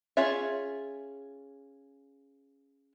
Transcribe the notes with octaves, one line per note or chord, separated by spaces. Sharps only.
C#4 F4 G#4 C#5 E5